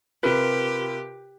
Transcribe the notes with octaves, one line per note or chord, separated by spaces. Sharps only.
C3 F4 G4 A#4 B4